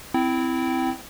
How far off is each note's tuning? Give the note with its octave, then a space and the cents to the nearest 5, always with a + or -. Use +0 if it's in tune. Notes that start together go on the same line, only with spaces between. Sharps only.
C4 -15 E4 +0 G5 -15